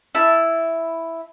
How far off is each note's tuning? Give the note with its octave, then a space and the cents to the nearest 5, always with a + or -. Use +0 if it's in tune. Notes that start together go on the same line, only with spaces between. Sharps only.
E4 +0 A5 +0